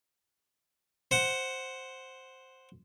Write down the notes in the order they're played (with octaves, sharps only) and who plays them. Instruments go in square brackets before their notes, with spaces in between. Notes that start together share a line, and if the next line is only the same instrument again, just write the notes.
[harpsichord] C5 F#5